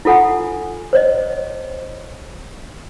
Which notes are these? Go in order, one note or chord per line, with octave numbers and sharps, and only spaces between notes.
E4 F4 A4 F#5 G#5
C5 C#5 D#5